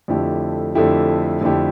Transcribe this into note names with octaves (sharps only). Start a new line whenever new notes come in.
F2 D3 A3 E4 G4
F2 D3 A3 E4 G4
F2 D3 A3 E4 G4